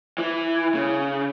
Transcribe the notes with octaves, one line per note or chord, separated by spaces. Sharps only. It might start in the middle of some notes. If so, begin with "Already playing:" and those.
E3
C#3